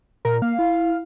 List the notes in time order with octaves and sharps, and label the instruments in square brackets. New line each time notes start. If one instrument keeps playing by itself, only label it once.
[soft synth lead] A#2 [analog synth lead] A#4
[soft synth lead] A#3 [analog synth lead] F5
[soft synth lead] E4